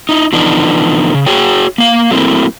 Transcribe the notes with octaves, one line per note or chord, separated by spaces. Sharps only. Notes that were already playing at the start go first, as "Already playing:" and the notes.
D#4 E4
D3 E3 F3 B3 D4 D#4
C#3
F#4 G#4 C#5 G5
A#3 F5
F#3 A3 A#3 C4 E4